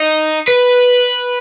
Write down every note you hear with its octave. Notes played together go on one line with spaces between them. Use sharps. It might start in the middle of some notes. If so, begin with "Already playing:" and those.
Already playing: D#4
B4